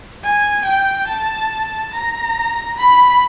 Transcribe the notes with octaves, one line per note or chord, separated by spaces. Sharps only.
G#5
G5
A5
A#5
B5